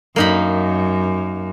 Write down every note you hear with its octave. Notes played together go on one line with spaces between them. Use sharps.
F#2 A#3 D#4 B5